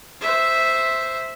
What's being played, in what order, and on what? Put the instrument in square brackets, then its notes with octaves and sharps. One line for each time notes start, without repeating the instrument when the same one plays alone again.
[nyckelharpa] C5 E5